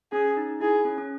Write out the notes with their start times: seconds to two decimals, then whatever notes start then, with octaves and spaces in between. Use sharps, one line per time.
0.12 C#4 G#4
0.37 D#4
0.60 E4 G#4
0.85 C#4
0.98 C#4